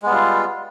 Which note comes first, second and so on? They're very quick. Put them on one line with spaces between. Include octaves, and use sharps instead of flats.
G#3 B3 G3 F4